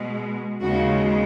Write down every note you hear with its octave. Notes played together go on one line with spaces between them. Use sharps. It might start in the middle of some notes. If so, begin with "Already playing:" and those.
Already playing: B2 G#3
D#2 C#3 G#3 F#4